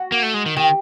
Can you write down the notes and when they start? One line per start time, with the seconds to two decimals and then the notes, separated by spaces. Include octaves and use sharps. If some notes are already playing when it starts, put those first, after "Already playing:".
Already playing: F#4
0.12 A#3
0.23 A3
0.34 G#3
0.46 D#3
0.57 D#3 G4